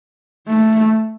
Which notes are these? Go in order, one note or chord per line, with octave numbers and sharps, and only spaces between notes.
A3